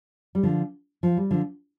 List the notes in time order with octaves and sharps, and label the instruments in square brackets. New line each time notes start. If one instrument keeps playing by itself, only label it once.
[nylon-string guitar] G3
D3 F3
F3
G3
D3 F3